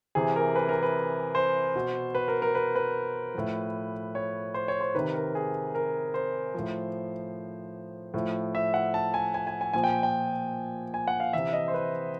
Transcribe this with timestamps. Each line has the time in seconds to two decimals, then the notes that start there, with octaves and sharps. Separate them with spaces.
0.15 C3 E3 G#4
0.36 A#4
0.56 B4
0.69 A#4
0.83 B4
1.35 C5
1.75 B2
2.15 B4
2.28 A#4
2.42 A#4
2.55 B4
2.75 B4
3.35 A2 F3
4.15 C#5
4.54 C5
4.68 C#5
4.81 C5
4.95 C3 D#3 B4
5.14 A#4
5.35 G#4
5.75 A#4
6.14 C5
6.54 A2 F3
8.14 A2 F3
8.55 E5
8.74 F#5
8.94 A5
9.14 G#5
9.34 G#5
9.47 G#5
9.61 G#5
9.73 A#2 F3 G#5
9.84 G5
10.03 G5
10.94 G#5
11.08 F#5
11.20 F5
11.33 C3 E3 E5
11.53 D#5
11.68 C5
11.74 B4